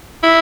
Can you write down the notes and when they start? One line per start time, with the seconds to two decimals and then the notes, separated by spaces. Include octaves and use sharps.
0.23 E4